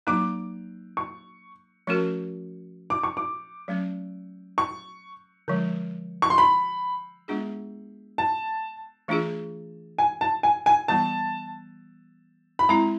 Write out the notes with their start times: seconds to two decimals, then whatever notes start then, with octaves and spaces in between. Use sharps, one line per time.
0.07 F#3 A#3 D#4 D6
0.97 C#6
1.87 F3 A3 C#4 F#4 A#4
2.90 D6
3.03 C#6
3.17 D6
3.68 F#3 A3 C#4
4.58 C#6
5.48 D3 F3 G#3
6.22 C#6
6.30 C6
6.38 B5
7.28 G#3 B3 D4 F4 G#4
8.18 A5
9.08 E3 A3 D4 F4 G#4
9.98 G#5
10.21 A5
10.43 G#5
10.66 G#5
10.88 E3 G3 B3 A5
12.59 B5
12.69 G#3 C4 E4 A#5